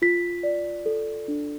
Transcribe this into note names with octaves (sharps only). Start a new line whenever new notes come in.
F4 B6
D5
A4
D4